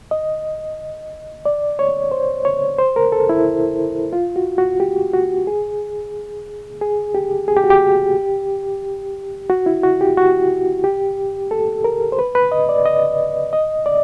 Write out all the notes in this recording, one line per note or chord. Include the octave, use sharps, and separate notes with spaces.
D#5
D5
C#5
C5
C#5
C5
A#4
A4
E4
F4
F#4
F#4
G4
F#4
G#4
G#4
G4
G#4
G4
F#4
G4
F#4
E4
F#4
G4
F#4
G4
A4
A#4
C5
B4
B4
D#5
D5
D#5
D#5
D5